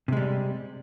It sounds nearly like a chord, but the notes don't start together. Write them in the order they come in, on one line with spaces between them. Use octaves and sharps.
C3 G#3 G3